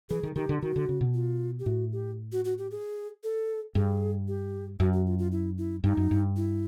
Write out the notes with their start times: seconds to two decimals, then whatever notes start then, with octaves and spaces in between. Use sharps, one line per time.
0.10 E3 G#4
0.23 D#3
0.36 D#3 G4
0.49 D3
0.62 D#3 F#4
0.76 D3
0.89 C#3
1.01 B2
1.14 F4
1.59 G4
1.66 A2 F#4
1.93 G4
2.32 F#4
2.45 F#4
2.58 G4
2.71 G#4
3.24 A4
3.75 G2 G#4
4.28 G4
4.80 F#2 F#4
4.93 F#4
5.06 F4
5.19 F4
5.32 E4
5.58 E4
5.84 G2 D#4
5.97 F#2
6.11 G2
6.37 E4